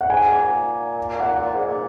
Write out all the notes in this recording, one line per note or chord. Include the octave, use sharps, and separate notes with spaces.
F#5
G#2 G#5
A#2
F#5
A#2
G#2
A#2